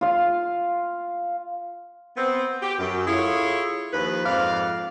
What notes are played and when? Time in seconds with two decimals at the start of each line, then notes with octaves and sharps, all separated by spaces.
0.01 F4 F5
2.16 B3 C4
2.62 G4
2.78 F#2
3.07 E4 F4 G#4 A4 C#5
3.92 D#2 F3 B4
4.25 F2 G#2 D5 F5